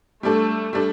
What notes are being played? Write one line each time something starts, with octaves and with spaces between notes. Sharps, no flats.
G3 A3 D4 A4
G3 D4 A4